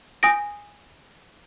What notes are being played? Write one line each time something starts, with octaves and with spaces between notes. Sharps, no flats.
G#5 D#6 G6 A#6 D7